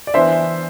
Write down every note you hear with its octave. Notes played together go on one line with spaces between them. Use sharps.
D5
E3 B3 D4 C5 E5